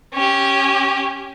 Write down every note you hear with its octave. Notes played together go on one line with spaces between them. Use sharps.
C#4 G4